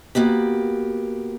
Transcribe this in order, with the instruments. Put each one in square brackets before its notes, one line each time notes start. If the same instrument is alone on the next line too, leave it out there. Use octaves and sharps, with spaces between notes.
[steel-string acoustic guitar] A#3 B3 F#4 G4